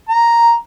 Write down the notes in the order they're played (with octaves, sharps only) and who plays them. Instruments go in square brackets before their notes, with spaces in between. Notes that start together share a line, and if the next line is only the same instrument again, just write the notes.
[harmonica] A#5